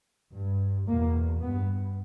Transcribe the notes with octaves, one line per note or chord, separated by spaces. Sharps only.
G2
E2 B2 A#3
G2 B3